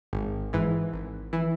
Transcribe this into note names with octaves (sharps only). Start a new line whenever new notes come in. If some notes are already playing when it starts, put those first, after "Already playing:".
G#1
G#2 E3
G#1
E3